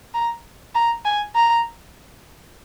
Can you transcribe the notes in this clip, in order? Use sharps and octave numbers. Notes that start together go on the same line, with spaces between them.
A#5
A#5
G#5
A#5